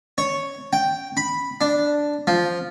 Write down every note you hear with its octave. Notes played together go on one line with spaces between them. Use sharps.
C#5
G5
B5
D4
F3